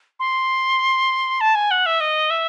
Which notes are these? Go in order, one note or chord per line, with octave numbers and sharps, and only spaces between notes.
C6
A5
G#5
F#5
E5
D#5
E5